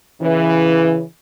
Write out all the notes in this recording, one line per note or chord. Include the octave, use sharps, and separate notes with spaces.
C#3 E3